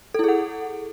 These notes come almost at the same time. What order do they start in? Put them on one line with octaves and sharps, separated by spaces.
A4 E4 G#4 F#5